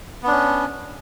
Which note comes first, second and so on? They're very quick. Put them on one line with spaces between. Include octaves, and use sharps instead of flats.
B3 D4 C#4